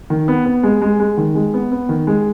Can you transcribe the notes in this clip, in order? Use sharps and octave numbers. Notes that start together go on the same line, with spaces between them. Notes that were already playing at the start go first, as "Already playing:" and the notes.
D#3
B3
B3
G#3
G#3
G#3
D#3
G#3
B3
B3
D#3
G#3